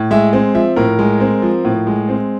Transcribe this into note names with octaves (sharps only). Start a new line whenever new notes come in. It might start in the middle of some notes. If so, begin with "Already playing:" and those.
Already playing: A2
G#3 E5
C4
F3 E5
A2 A#4
G#3
C4
F3
A2
G#3
C4